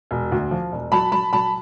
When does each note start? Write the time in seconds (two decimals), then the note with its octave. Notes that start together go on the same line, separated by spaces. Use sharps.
0.11 E1
0.32 D2
0.51 F3
0.72 E1
0.92 F#3 A5 B5
1.12 F#3 A5 B5
1.33 F#3 A5 B5